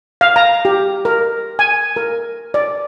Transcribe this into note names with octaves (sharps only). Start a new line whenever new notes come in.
F5
A#5
G4
A#4
G#5
A#4
D5